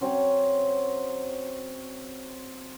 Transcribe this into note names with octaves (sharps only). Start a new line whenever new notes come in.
F#3 C4 C#4